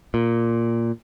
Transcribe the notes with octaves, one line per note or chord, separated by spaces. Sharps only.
A#2